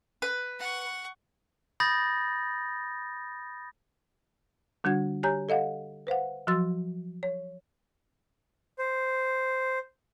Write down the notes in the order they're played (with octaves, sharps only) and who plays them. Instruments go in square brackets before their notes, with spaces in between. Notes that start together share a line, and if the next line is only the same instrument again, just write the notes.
[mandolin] B4
[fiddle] F#5 C#6
[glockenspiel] B5 D#6 G6 A6 A#6
[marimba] D3 G3 D4 F#4 F#5 G#6
G4 C#5 G#5 A#5 G6
A4 D#5 F5 F#5
B4 C5 F5 F#5
F3 F#3 F#4 C6 E6 A6
C#5
[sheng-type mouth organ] C5